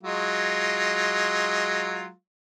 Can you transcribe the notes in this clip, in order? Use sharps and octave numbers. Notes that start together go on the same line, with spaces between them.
F#3 G#3 F4